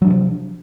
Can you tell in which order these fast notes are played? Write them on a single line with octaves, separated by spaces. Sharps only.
F#3 D4 C3 F3